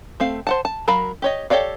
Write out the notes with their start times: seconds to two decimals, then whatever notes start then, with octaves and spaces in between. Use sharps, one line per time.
0.20 A3 C4 F5
0.47 C5 F#5 A5
0.65 A5
0.88 F#3 A#4 F5 A#5 B5
1.22 G4 C#5 D#5
1.50 G4 A4 C#5 D5 F5